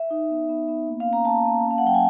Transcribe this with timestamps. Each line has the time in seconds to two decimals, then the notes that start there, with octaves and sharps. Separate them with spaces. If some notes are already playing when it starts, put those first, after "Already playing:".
Already playing: E5
0.11 D#4
0.30 B3
0.49 B3
0.68 B3
0.88 A#3
1.00 F5
1.07 C#4
1.13 A#5
1.25 A#3 A5
1.45 A#3
1.64 C#4
1.71 F5
1.78 F#5
1.83 F#3 G5
1.94 G#5